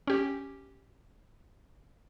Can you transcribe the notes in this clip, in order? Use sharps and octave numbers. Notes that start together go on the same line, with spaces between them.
C#4 G4